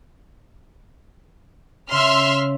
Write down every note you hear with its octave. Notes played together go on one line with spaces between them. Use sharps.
C#3 E5 C6 F6